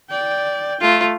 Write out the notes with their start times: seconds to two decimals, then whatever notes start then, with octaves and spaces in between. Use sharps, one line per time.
0.10 D5 G5
0.81 A3 F4